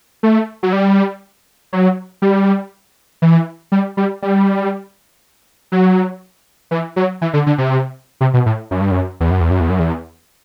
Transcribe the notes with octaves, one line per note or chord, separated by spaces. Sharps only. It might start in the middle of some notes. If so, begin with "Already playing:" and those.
A3
F#3
G3
F#3
G3
E3
G3
G3
G3
F#3
E3
F#3
E3
D3
D3
C3
C3
B2
A2
F#2
G2
F#2
E2
F#2
E2
F#2
E2
F#2
E2